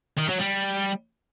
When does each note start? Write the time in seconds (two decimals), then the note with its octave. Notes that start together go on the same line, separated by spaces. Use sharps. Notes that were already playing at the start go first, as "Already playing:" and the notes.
0.18 D#3
0.29 F#3
0.40 G3